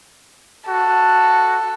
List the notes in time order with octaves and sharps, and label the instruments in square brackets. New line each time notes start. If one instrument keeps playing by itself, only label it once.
[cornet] F#4 [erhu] A4